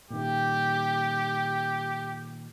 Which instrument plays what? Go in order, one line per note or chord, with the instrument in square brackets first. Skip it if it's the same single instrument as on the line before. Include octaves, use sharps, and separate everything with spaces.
[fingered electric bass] A#2 D#3 [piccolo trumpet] G4